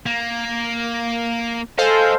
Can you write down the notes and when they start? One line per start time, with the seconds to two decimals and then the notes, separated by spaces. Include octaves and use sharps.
0.06 A#3
1.78 A4 C5 D#5 F5 G#5